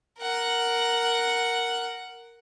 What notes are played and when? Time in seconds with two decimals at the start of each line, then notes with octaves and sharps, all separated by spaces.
0.20 A#4 F#5